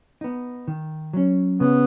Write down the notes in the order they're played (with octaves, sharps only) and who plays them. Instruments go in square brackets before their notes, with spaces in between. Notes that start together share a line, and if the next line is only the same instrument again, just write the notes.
[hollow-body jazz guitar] B3 D#4
D#3
F#3 C#4
[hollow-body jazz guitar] C#3 [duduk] B3